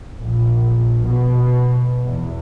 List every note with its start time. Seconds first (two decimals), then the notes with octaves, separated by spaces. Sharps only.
0.20 A#1
1.06 B2
2.05 E2